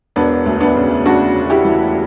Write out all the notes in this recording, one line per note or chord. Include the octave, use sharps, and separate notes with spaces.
E1 B3 D4
D2
B3 D4
C#3
C#3 D4 F#4
E1
E4 G4
E3